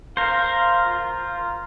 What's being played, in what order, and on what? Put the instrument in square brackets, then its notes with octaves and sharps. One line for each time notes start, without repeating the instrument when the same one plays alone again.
[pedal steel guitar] A#4 C5 [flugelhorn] F5
[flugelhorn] F4